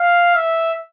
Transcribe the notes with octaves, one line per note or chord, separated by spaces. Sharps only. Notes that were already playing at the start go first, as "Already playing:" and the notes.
Already playing: F5
E5